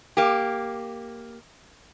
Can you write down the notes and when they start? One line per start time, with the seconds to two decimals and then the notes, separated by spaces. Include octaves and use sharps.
0.17 A#3 G4